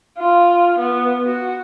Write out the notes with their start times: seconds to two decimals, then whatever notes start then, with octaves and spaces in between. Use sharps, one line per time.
0.19 F4
0.79 B3
1.26 F#4